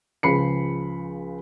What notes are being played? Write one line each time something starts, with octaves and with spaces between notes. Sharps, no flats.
C#2 C#3 F3 B5 C7 C#7